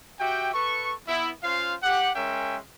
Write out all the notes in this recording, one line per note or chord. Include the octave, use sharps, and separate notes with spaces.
F#4 G4 E5 G5
A4 B4 C#6
B3 E4
C#4 F4 C5 F5
G4 F#5
G#3 C#4 A#4 E5 G5